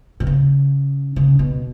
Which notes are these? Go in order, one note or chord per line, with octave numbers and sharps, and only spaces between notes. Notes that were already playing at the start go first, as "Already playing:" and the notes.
B2
C#3
C#3
B2